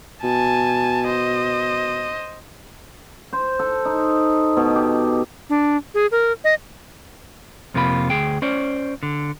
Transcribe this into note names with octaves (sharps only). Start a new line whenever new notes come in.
B2 G#5 A5
C5 D#5
C5
A4
D#4
B2
G4
D4
G#4
A#4
D#5
F2 C3 A#3 F4 B5
D2 G#4 G5
C#4 C5 D5
D3